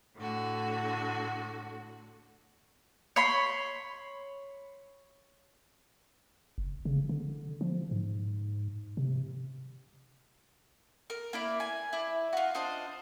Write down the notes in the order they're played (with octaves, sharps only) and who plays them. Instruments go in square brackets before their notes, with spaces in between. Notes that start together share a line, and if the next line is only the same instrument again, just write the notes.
[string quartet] A2 D3 F#4
[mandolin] C#5 B5 C6
[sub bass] F#1
C#3
D3
F3
G#2
C3
[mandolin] A#4
A#3 E4 D5
G#5
E4 D5
F4 F#4
D4 F4 C5 D#5